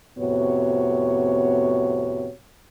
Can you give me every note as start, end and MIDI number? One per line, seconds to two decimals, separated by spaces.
0.18 2.31 41
0.18 2.31 45
0.18 2.31 48
0.18 2.31 59
0.18 2.31 66
0.18 2.31 73